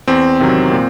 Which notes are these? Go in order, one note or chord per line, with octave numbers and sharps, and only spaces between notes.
E2 C4
C3 D#3 F#3
A#2